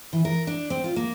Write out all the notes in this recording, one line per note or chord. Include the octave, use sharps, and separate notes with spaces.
E3
A#4
D4
C4
F4
A#3